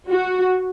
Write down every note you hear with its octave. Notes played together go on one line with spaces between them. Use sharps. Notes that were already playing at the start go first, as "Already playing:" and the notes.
F#4